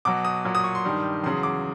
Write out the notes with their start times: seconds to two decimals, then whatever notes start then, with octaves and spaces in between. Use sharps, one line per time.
0.05 B2 F#3 D6
0.25 D#6
0.45 A#2 F#3
0.55 D#6
0.64 C#6
0.75 C6
0.85 G2 D#3 G3
1.24 E2 C#3 F#3 C6
1.43 D6